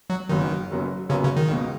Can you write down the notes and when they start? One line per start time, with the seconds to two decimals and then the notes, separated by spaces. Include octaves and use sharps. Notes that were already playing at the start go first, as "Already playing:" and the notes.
0.10 F#3
0.29 F#1 F#2 D#3 F#3 B3
0.70 F#1 F#2 F#3 B3
1.09 F#1 F#2 C#3 F#3 B3
1.23 C#3
1.37 D#3
1.50 C#2 B2 G#3